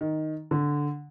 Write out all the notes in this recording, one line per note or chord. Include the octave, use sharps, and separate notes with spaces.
D#3
D3